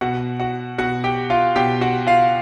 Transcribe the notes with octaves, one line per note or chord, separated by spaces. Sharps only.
B2 F#4 F#5
F#4 F#5
B2 F#4 F#5
G4 G5
F4 F5
B2 G4 G5
F#4 F#5
F4 F5